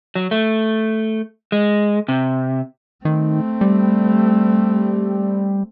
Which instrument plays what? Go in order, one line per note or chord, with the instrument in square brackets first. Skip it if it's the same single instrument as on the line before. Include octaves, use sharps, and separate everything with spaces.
[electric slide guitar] F#3
A3
G#3
C3
[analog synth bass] D#3 [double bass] A3 C4
[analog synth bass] G3